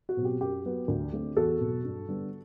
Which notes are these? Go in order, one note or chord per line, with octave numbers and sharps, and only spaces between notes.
F#4
B2 F#3 C4
G4
F#2 G4
F#3 B3
D2
D3 A3 C4
E2 F#4 A4
B2 F#3
G2
D3 G3 B3